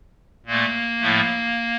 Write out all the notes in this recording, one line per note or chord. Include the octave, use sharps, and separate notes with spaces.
A#2 A3 A#3
A2 F3 A3